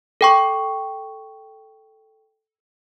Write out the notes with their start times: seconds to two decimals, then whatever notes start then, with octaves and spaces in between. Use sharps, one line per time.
0.21 A4 G5 C#6